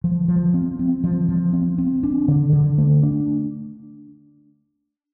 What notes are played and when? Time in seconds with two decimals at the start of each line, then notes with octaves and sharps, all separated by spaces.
0.04 F3
0.28 F3
0.54 C4
0.79 C4
1.04 F3
1.29 F3
1.53 C4
1.78 C4
2.03 D4
2.28 D3
2.53 D3
2.78 A3
3.03 D4